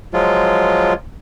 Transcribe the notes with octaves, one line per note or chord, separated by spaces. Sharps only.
F3 F#3 G#3 F4